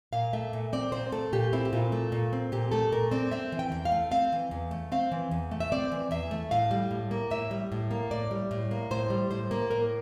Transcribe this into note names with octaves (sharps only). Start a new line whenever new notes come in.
A#2 F5
A3 E5
A#2
C4 D5
A#2 C5
A3 A4
A#2 G4
C4 E4
G4
A#2 F4
A3
A#2
C4
A#2 G4
A3 A4
A#2 A#4
C4 D5
C4 E5
E3
G5
E2
F5
A3
C4 F5
E3
E2
A3
C4 F5
E3
E2
A3
E5
C4 D5
E3
E2 E5
A3
A2 F5
G3
A2
A#3
A2 E5
G3
A2
A#3
A2 D5
G3
A2
A#3
A2 C5
G3
A2 C5
A#3
A2 A#4